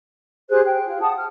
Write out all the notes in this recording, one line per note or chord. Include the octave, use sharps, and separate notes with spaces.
G4 G#4 C5 F#6
G5
F4
F#5 A5 D#6
F6